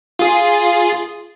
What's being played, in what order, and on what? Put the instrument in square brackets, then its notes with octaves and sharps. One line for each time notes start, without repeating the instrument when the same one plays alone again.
[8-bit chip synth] F4 G#4